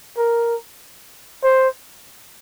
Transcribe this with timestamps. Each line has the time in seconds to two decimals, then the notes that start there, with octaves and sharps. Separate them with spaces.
0.18 A#4
1.43 C5